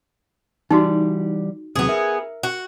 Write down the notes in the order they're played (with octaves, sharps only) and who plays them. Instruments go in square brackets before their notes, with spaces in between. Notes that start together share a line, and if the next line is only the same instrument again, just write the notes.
[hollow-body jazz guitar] E3 G3 D5 [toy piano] D#4 F#4
[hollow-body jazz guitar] D#2 C3 F#3 [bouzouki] B3 G#4
[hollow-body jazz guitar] A#4 E5
[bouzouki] F#4